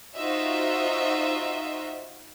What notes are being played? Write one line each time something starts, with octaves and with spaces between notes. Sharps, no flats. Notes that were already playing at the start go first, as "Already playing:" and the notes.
D#4 F4 F#4 C5 D#5 E5